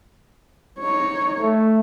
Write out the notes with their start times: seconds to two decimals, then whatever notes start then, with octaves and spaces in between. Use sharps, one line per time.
0.80 D#4 C#5
1.40 A3